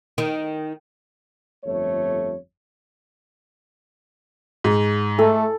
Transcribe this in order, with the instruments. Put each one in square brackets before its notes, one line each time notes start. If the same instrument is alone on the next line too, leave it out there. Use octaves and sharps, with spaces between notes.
[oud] D#3
[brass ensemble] G1 F2 A3 C#5
[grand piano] G#2
[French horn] A3 [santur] A4